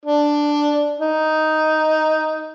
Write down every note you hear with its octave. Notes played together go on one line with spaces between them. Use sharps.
D4
D#4